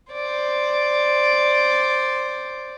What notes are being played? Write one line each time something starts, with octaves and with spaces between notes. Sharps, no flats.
C5 D5